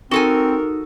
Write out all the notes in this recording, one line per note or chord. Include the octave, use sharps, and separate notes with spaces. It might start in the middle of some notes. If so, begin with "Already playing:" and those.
C4 D#4 F#4 A4 A#4 G#5